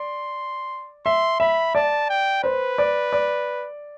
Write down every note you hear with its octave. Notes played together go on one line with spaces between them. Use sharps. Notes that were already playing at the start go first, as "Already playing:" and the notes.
Already playing: D5 C6
E5 C6
E5 B5
D5 A5
G5
B4 C5
D5
D5